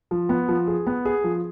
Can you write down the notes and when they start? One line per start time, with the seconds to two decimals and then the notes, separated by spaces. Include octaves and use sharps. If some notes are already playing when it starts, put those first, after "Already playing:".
0.11 F3
0.29 B3
0.49 F3
0.67 G#4
0.87 B3
1.05 G#4
1.24 F3